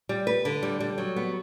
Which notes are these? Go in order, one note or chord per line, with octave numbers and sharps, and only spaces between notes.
G3
B4
D3
G3
G3
F#3
B3